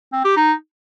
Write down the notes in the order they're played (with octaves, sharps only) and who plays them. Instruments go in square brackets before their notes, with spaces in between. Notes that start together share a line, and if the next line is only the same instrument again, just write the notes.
[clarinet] C4
G4
D#4